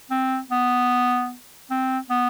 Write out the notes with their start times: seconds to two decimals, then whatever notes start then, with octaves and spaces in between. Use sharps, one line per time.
0.11 C4
0.51 B3
1.71 C4
2.10 B3